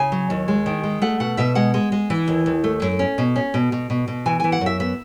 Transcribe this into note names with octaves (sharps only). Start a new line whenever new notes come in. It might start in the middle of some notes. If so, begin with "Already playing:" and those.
Already playing: C#3 G#5
F#3
D#2
G#3
D#3
G#3
A3 F#5
B2 F#5
B2 E5
G#3 F#5
G#3
G#3
E3
D#2
D#2
A3
F#2
C#4
B2
C#4
B2
B2
B2
B2
E3 G#5
E3 G#5
F#5
F#2 E5
B3 E5